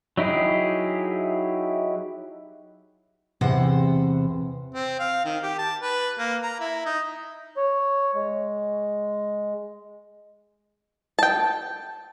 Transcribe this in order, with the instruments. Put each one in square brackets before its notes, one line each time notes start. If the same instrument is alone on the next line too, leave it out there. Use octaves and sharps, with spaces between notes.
[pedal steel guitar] F#3 D#4 E4 G4 G#4
[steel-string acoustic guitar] E2 C3 C5 F#5
[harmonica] C4
F5
D#3
G4
A5
B4
A#3
A#5
E4
D#4
[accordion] C#5
G#3
[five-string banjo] G5 A5